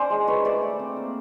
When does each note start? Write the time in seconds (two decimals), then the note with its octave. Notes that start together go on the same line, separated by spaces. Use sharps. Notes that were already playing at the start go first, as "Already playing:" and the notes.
Already playing: C#4 D4 C5 D5
0.10 G#3
0.27 D4 B4 C#5
0.44 A3 C5 D5
0.62 A3
0.79 C4
0.96 A#3